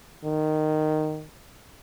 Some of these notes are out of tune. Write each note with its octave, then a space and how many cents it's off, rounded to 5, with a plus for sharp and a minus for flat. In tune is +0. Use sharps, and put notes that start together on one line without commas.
D#3 -10